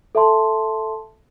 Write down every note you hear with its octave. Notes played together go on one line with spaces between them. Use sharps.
A4 E5 A5 C6